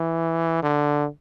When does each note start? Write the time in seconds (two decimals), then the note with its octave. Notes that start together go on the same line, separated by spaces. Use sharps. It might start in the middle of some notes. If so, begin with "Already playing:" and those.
Already playing: E3
0.63 D3